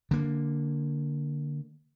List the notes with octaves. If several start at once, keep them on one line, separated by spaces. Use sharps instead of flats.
D3 A#3